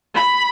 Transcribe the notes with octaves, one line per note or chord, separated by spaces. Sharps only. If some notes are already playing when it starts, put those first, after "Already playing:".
B5